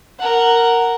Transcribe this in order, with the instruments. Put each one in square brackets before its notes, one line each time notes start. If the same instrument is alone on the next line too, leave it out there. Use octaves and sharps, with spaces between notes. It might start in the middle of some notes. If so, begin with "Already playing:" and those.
[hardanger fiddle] A#4 F#5